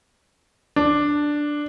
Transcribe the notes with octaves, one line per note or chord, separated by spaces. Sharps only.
D4